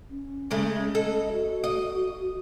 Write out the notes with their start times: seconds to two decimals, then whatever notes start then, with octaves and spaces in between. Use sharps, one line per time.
0.10 C#4
0.51 C#3 G#3 A3
0.95 A4 D#5
1.33 F#4
1.64 D#5